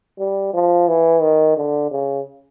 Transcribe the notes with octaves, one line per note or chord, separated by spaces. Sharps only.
G3
F3
E3
D#3
D3
C#3